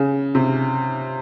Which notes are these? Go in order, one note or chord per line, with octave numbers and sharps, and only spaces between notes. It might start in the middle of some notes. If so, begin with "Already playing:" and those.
Already playing: C#3
C3